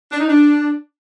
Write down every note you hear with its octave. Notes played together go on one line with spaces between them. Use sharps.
D4
D#4
D4